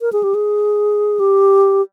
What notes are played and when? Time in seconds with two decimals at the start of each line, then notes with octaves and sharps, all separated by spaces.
0.01 A#4
0.12 G#4
0.23 G4
0.34 G#4
1.19 G4